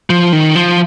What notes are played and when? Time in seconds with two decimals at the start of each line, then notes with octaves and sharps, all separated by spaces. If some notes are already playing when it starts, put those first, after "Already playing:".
0.10 F3
0.33 D#3
0.56 F3